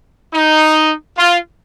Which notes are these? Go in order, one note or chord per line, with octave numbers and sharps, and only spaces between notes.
D#4
F4